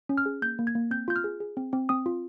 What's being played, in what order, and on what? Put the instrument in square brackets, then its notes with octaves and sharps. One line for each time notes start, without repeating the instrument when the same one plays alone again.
[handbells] C#4
F6
G#4
A#3 G6
A#3
G#6
A#3
C4 G6
F4 G6
F6
G#4
G#4
C4
C4
C4 D#6
F4